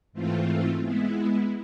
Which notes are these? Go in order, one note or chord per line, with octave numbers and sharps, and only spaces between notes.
G#2 E3 A3 C4 F4
G#3 B3 E4